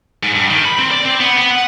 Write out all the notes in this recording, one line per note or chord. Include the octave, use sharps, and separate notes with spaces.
G#2
G2
D#3
B5
C4
D5
C4
B3
B3
F#5